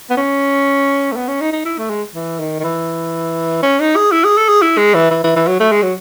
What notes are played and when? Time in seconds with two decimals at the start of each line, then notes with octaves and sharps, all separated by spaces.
0.10 B3
0.17 C#4
1.13 A3
1.16 B3
1.28 C#4
1.41 D#4
1.53 D#4
1.65 E4
1.78 A3
1.90 G#3
2.15 E3
2.39 D#3
2.60 D#3
2.64 E3
3.63 C#4
3.80 D#4
3.96 G#4
4.12 E4
4.24 G#4
4.38 A4
4.49 G#4
4.62 E4
4.78 G#3
4.95 E3
5.11 E3
5.24 E3
5.36 E3
5.48 F#3
5.60 A3
5.72 G#3
5.83 F#3